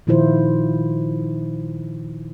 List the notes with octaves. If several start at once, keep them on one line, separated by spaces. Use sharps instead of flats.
A#2 D#3 F3 E4 F4 C5